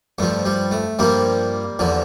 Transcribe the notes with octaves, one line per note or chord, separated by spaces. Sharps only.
G2 F3 A3
G3
A3
G2 F3 G3 A#3
E2 D3 F3